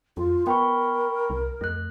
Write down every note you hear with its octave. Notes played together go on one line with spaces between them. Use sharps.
F2 F4
B3 A#4 G5 B5 C#6
C2
F2 A3 F#6